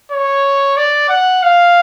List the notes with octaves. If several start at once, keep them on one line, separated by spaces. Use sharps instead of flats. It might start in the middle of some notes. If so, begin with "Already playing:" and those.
C#5
D5
F#5
F5